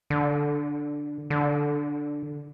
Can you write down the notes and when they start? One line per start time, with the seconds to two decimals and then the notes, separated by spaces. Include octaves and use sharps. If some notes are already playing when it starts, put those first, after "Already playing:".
0.10 D3
1.30 D3